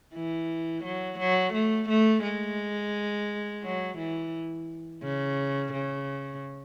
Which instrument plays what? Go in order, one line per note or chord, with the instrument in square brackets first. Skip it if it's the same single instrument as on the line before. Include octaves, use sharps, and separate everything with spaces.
[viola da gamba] E3
F#3
F#3
A3
A3
G#3
F#3
E3
C#3
C#3